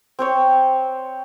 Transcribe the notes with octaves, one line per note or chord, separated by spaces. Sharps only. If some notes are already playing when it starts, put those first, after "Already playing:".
C4 C5 C#5